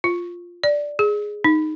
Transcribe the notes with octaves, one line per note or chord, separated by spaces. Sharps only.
F4
D5
G#4
D#4